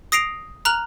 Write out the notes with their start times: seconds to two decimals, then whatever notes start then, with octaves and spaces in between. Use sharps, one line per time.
0.12 D#6 A#6 C7 D7 F7
0.65 A#5 F6 F#6 F7 F#7